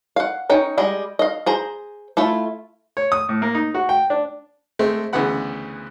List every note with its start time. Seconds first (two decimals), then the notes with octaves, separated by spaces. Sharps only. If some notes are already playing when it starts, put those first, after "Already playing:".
0.16 F5 F#5
0.50 C#4 D#4 G5
0.78 G3 G#3 D#5
1.19 D#5 F5
1.46 G#4 C5 A#5
2.17 A3 E4 F4
2.97 C#5
3.12 D#6
3.29 A2
3.42 A#3
3.55 D#4
3.74 F#4
3.89 G5
4.10 D4
4.79 G#3 A3 C4
5.13 D2 C#3 E3 B3 F#5 B5